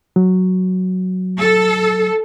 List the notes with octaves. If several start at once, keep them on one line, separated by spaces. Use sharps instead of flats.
F#3
A4